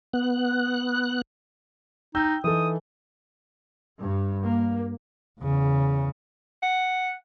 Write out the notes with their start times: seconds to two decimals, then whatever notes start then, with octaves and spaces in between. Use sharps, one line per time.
0.13 B3 F#6
2.15 D#4 G5 E6 G6
2.44 E3 D#4 A4 D#6
3.98 G2
4.47 A#3
5.40 E2 C#3
6.63 F#5